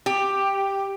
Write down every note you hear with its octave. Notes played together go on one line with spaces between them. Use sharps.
G4